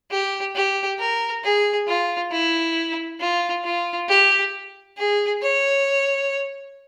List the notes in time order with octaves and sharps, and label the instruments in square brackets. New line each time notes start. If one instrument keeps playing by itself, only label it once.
[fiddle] G4
G4
A#4
G#4
F4
E4
F4
F4
G4
G#4
C#5